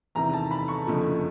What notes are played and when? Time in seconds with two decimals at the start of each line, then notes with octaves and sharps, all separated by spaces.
0.15 E2 C3 D#3 A#5
0.33 A5
0.51 B5
0.68 C#6
0.87 F#1 F2 D3 F3